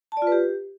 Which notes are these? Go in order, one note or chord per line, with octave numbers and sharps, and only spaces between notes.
A5
D5
F4
B4
G4